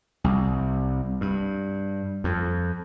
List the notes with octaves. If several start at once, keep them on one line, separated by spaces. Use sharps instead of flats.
C2
G2
F2